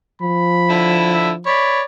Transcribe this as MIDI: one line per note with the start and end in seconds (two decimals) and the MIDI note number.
0.22 1.51 53
0.22 1.04 83
0.70 1.32 50
0.70 1.32 64
1.13 1.33 76
1.47 1.82 73
1.47 1.82 74
1.47 1.83 83